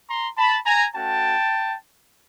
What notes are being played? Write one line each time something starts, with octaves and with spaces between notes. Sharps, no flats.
A#5 C6
A5 B5
G#5 A#5
A3 C#4 F#4 G5 A5